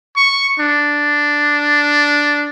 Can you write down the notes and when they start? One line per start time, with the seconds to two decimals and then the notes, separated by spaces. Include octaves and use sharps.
0.16 C#6
0.60 D4